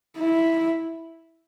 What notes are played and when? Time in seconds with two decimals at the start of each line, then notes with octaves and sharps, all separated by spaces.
0.19 E4